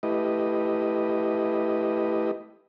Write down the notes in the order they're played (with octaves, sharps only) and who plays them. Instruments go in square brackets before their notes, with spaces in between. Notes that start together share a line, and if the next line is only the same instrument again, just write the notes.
[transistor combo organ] A3 E4 G4 B4 D#5